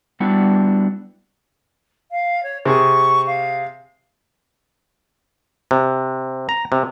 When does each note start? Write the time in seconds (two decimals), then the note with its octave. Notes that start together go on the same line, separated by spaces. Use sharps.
0.20 G3 B3 D4 E4 F#4
2.11 F5
2.43 C#5
2.65 C3 G#4 C#6
3.26 F5
5.71 C3
6.49 A#5
6.72 C3